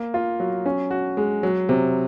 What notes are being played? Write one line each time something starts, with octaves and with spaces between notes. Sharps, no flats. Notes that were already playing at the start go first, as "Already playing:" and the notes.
Already playing: A#3
F4
F#3
C#4
F#4
G#3
F#3
C3